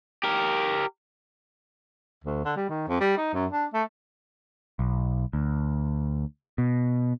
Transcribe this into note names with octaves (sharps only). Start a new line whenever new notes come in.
G4 A#4
D2
D3
G3
D#3
F2
G3
D#4
F#2
D4
A3
B1
D2
B2